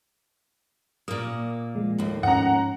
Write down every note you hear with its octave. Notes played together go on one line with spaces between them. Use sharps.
A#2 A#3 D#6
F3 G#3
D#2 A2
G#2 F3 C#4 F#5 A#5